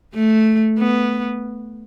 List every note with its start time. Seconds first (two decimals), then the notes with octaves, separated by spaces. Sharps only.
0.14 A3
0.79 B3